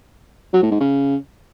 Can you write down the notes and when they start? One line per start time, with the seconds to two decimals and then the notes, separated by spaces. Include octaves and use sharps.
0.53 F#3
0.62 A2
0.71 G#2
0.80 C#3